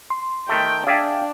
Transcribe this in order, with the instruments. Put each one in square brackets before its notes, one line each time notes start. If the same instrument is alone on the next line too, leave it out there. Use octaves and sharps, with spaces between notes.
[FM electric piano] C6
[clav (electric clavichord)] D#3 A3 [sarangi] G5
[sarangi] D4 [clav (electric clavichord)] G#4 D5 E5 [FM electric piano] F5 G5